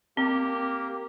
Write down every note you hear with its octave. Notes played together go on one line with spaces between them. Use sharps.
A#3 C4 G4 A#4